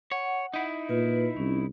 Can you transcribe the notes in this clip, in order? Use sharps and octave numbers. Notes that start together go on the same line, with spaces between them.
C#5 F#5
D#4 E4
A#2 F4 B4
C2 C#4